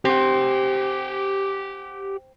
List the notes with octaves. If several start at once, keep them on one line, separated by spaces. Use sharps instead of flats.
C4 G4 F#5